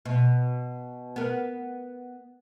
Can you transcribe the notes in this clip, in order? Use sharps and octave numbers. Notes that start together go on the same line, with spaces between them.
B2
B3 A#4